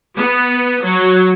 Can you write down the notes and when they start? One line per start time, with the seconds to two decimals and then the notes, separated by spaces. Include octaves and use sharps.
0.17 B3
0.83 F#3